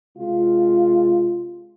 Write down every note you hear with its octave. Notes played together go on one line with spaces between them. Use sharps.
C3 G#3 F4